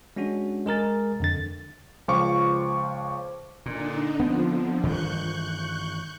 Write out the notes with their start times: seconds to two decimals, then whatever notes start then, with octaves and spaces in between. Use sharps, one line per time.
0.16 G#3 C#4 D4 F#4
0.66 G#3 G#4 A#4 A6
1.20 F2 D3 A6
2.08 C#2 F3 C5 F5 C#6 D6
3.66 A#2 D3 D4 D#4
4.20 D3 F3 B3 C4
4.83 G2 D#3 E3 C#6 F#6 G6